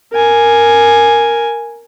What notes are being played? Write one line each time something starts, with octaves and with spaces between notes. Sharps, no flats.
A#4 G#5